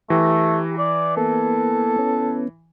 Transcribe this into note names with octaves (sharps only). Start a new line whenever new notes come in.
E3 A3 G4 A#5
D5
A#3 B3 A4
B3 C#4